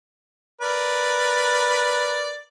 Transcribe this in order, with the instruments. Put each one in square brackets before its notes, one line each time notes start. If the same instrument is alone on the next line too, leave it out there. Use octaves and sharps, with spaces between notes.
[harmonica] A#4 B4 D5